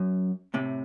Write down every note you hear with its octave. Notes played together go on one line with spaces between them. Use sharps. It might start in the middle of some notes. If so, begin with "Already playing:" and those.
Already playing: F#2
A2 C3